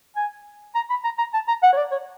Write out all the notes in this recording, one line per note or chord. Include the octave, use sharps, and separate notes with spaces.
G#5
A#5
B5
A#5
A#5
A5
A#5
F#5
C#5
D5
C#5